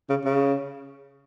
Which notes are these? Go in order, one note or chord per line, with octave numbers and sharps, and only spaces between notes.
C#3
C#3